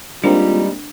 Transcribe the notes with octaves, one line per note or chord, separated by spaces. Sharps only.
G3 G#3 A#3 C4 D4 D#4 F4